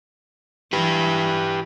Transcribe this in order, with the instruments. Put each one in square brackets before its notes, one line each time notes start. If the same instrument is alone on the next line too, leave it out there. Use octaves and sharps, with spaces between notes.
[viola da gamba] E3 [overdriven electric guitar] G4 B4